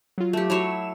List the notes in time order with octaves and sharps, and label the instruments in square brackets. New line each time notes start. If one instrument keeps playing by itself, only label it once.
[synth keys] F#3 F4
[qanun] A3 G4
[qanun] F#3 E4 C#5 [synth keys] E7